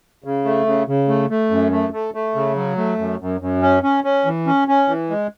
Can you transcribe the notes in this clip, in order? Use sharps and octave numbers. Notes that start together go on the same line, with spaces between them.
C#3
A3
C#3
C#3
A3
A3
F#2
A3
A3
A3
C#3
F#3
A3
F#2
F#2
F#2
C#4
C#4
C#4
E3
C#4
C#4
E3
G#3